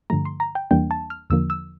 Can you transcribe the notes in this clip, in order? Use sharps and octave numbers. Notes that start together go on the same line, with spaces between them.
G2 D3 F3 A3 A#5
C6
A#5
G5
E2 E3 G3 A#3 D4 G5
A5
F6
E2 D3 F3 A#3 E6
E6